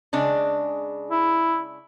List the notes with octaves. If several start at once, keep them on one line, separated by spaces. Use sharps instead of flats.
C#3 G#3 D4
E4